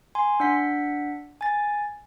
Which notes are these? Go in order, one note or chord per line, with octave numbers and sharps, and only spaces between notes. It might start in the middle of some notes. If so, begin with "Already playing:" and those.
G#5 C6
D4 F#5 B6
G#5 A6